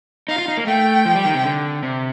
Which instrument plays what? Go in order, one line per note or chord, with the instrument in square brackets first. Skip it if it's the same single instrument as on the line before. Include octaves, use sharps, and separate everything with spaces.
[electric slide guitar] D#4 [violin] F5
[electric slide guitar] F4
D#4
A#3
[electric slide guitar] A3 [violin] G5
[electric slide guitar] F3
G3
D#3
C3
D3
C3